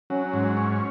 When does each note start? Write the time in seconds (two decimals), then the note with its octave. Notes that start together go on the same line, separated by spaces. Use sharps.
0.10 F#3 C#4
0.33 G#2
0.57 C#4